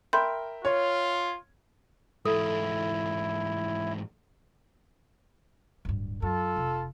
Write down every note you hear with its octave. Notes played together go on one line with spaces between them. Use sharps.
A#4 E5 G5 B5 C6 G6
F4 C#5
G#2 E3 E4 A4
D1 G2
F#2 F4 A4
F1